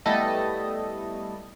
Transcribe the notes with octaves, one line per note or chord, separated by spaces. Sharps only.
G3 A3 B3 E4 A4 D#5